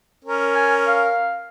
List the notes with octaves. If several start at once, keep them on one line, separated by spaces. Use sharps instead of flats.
C#4 A#4
G#5
F5